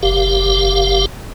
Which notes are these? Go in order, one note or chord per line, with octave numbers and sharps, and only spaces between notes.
F#1 G4 F5